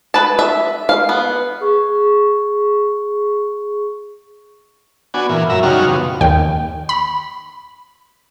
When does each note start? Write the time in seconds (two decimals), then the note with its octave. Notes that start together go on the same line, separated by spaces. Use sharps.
0.14 B4 A5
0.39 E5
0.89 F5
1.09 B3
1.61 G#4 C#6
5.14 B3 D4 F#4 G#5
5.30 A#2 E3
5.50 F#2 E5 A#5
5.63 F#2 C#3 G3 D#4 F#4 F6
5.87 B2 F3
6.21 D#2 G5
6.89 B5